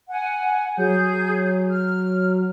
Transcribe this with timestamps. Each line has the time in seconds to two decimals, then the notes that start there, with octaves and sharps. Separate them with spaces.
0.09 F#5 G#5
0.77 F#3 G#4 G6
1.71 F6